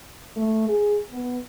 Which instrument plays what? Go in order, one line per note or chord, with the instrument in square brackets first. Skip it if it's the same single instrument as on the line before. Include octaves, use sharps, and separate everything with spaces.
[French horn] A3
G#4
B3